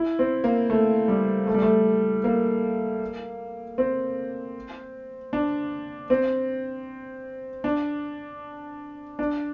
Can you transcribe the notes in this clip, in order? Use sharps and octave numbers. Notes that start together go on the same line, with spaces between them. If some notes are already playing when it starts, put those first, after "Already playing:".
Already playing: E4
C4
A#3
A3
G3
A3
G3
A3
A#3
C4
D4
C4
D4
D4